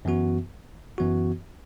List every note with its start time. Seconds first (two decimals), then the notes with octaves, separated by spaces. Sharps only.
0.05 F#2 E3 B3 F#4
0.98 F#2 E3 B3 F#4